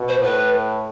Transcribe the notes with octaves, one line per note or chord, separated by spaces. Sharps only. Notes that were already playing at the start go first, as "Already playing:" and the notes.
Already playing: B2
C5
A2 B4